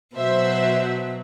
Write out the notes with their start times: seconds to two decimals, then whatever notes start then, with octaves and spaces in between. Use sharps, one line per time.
0.16 B2 F#3 C5 E5